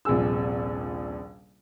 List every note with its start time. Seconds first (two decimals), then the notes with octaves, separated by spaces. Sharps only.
0.05 D#1 A#1 C3 G#4 E6